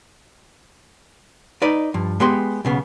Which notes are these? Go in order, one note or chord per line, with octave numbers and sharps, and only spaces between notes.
D#4 B4 D5
G2 F3
G#3 B3 G4 C6
B1 C#3 B3